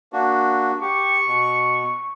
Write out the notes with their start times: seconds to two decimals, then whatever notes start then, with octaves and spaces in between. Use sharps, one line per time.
0.13 A#3 D4 F#4
0.81 G4 C#6
1.27 B2